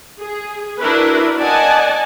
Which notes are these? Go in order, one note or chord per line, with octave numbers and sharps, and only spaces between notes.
G#4
D4 E4 F#4 A#4 B4
D5 D#5 F#5 G#5 A5